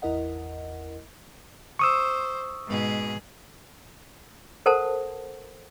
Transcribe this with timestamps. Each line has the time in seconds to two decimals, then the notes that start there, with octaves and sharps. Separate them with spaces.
0.02 G#1 E2 E4 A#4 D#5 F#5
1.79 C5 C#6 D#6 E6
2.67 G#2 B2 G#4
4.66 A4 A#4 C5 F#5 A5